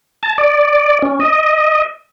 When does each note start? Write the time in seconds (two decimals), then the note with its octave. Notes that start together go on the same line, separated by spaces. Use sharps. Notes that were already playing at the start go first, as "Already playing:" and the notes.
0.23 A5
0.38 D5
1.02 C#4
1.20 D#5